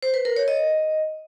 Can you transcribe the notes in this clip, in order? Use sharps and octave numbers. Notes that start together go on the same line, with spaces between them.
C5
B4
A#4
C#5
D#5